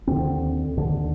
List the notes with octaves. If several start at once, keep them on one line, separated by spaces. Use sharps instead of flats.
D#2 D3 C4
D#2 D3